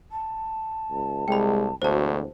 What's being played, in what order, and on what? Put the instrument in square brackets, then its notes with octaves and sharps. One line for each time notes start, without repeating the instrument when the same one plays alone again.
[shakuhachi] A5
[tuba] C#2
[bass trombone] C2 [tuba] G#3 [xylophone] G5 B5
[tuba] E1 [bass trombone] D2 [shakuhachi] F#4 [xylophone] C5 A5